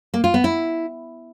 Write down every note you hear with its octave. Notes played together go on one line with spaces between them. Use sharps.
A#3
F4
B3
E4